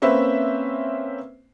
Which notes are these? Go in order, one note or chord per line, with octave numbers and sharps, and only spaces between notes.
A#3 C4 C#4 B4 C5 E5